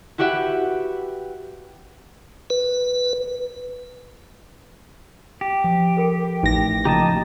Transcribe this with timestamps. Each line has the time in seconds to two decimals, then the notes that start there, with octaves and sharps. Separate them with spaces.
0.18 E4 F#4 G4 B4 E5 F#5
2.50 B4
5.41 G4
5.64 F3
5.97 A4 A#4 G5
6.43 A1 D#4 A#6
6.85 C#3 F3 A#3 G4 D#5 A5 A#5